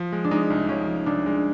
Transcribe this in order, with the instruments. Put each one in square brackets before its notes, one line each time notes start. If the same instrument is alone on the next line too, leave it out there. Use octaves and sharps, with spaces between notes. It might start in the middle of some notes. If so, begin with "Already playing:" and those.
Already playing: [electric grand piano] F3
G#3
[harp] D4
[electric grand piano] G#3 [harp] D#4
[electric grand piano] C2
[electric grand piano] F3 [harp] C#4
[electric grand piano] F3
[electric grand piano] C2 [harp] D4
[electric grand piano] G#3